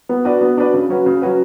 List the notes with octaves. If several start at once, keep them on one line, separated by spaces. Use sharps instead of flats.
B3
D4 F#4 B4 D5
B3
D4 F#4 B4 D5
C#3
F#3 C#4 F#4 B4
C#3
F#3 C#4 F#4 B4